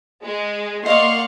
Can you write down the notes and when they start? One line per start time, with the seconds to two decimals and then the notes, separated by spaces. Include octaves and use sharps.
0.23 G#3
0.86 A#3 D5 D#5 F5 F#5 C6 C#6 D#6